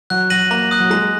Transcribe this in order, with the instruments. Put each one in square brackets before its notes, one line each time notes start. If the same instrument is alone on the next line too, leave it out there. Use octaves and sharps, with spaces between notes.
[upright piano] F#3 [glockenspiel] F#6
[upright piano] F#3 [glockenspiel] A#6 D#7 F#7
[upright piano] A#3 [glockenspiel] A#5
[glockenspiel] D#6 F#6
[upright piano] F#3
[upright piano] G#3 [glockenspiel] A#5